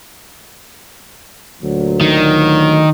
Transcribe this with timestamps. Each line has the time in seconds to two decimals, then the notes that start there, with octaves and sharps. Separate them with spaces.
1.62 D2 A#2 F#3
2.01 D#3